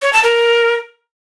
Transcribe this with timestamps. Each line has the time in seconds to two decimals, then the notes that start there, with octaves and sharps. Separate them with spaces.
0.02 C#5
0.13 A5
0.24 A#4